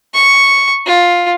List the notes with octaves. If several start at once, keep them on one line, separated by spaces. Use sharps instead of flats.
C#6
F4